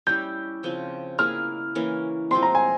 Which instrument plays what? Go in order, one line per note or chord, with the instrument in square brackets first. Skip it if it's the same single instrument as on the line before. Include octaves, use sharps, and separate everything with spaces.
[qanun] G3 C#4 E4 [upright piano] G6
[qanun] C#3 F3 C4
[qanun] A#3 E4 G#4 [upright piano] F6
[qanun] E3 A#3 C#4
[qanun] F3 G#3 C4 [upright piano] C6
[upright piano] A#5
G#5